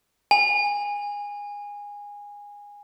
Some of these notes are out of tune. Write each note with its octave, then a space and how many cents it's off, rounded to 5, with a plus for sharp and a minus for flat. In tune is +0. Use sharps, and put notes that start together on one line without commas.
G#5 -20